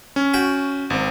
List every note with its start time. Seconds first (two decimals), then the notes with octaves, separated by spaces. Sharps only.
0.16 C#4
0.34 F#4 G5
0.90 G#1 C4